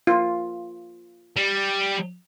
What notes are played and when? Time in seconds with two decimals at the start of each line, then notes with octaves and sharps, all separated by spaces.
0.07 F4
1.37 G3